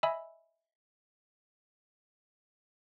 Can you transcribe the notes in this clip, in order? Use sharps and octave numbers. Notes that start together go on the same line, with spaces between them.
D#5 E5 G#5 B5 E6